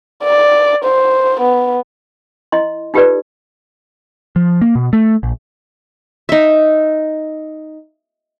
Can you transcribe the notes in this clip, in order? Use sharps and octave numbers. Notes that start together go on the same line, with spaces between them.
D5
C5
B3
E4 D#5 C6
D#4 F4 G4 A4 B4 D5
F3
A#3
B2
A3
A#1
D#4 E5